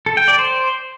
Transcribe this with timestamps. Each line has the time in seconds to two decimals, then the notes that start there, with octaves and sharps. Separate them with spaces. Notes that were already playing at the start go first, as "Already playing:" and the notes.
0.06 A4
0.17 G5
0.28 D5
0.39 C5